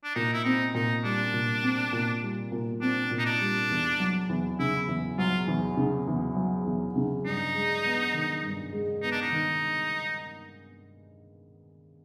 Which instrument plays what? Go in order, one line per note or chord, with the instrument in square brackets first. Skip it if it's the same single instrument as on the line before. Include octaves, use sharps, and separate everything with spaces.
[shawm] D4
[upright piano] A#2 [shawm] D#4
[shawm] E4
[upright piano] C4 [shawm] D#4
[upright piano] A#2 [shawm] D#4
[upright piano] G3 [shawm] D4
[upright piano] A#2
C4
A#2
G3
A#2
[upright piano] C4 [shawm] D4
[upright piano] A#2
[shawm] D#4
D4
[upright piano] G3
E2
F#3
E2
[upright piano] C#3 [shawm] E4
[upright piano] E2
[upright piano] F#3 [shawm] F4
[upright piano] E2
C#3
E2
F#3
E2
C#3
[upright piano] G2 [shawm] D#4
[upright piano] G#3
B3
D#3
G2
G#3
[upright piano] B3 [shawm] D#4
[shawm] D4
D#4
[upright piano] D#3